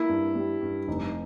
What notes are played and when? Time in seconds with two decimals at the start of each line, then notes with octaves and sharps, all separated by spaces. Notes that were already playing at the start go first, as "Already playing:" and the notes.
Already playing: A#3 E4
0.08 G2
0.35 G3
0.61 G2
0.87 F1 D#4